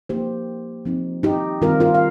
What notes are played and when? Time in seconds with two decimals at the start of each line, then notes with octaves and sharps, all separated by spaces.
0.09 F3 A#3 D#4 G4 C5
0.85 F3 C4 D#4
1.23 D#4 G4
1.61 D#3 G3 C4 D#4 F4 A#4
1.80 F4 A#4
1.94 F5